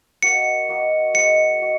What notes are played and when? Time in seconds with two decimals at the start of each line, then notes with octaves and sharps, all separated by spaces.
0.22 A#3 F#4 A#4 D#5 C#7
0.69 A#3 F#4 A#4 D#5
1.14 G#3 F#4 D#5 C#7
1.60 F#4 D#5